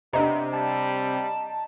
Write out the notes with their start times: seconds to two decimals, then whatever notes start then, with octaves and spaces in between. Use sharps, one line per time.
0.13 C3 B3 D4 D#5 A#5
0.53 G3 A5